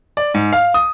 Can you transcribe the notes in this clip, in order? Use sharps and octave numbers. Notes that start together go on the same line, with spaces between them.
D5
G#2
F5
D#6